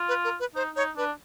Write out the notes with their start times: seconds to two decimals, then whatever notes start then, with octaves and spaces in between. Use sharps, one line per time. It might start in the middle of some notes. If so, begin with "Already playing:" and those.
Already playing: F4
0.08 B4
0.24 A#4
0.40 B4
0.55 D#4 C5
0.76 D#4 C#5
0.97 D4 B4